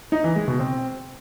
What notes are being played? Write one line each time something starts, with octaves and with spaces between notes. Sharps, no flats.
D#4
E3
G#3
B2
C4